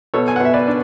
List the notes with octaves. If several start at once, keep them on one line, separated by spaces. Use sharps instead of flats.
B2 A4 C#5
G#5
F#5
B2
E5
B4 D5
D4